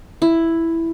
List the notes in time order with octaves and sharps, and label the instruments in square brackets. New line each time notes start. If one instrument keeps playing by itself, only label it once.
[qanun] E4